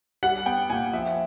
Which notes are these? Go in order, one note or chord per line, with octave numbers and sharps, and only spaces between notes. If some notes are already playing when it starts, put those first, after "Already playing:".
G3 F#5
B3 G5
A#2 G#5
F3 E5